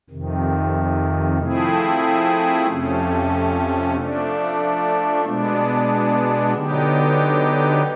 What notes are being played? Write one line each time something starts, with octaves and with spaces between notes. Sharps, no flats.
F2 C3 D#3
F3 A3 C4 E4 G#4
F2 C3 F3 A3 C#4
F3 A3 D4
B2 G#3 B3 D4
D3 F#3 B3 D#4 G4